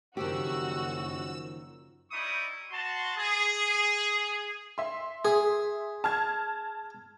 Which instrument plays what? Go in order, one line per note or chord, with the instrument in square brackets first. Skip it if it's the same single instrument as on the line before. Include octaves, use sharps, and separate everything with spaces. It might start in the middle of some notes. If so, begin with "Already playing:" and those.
[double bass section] F#1 [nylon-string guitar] D#3 F3 G4 [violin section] F#4 [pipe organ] E6
[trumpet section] G3 A#3 D#4 E4 C#6 D#6
F#4 A5 C6
G#4
[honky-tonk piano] E5 C6
[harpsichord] G#4
[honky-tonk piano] A5 F6 G#6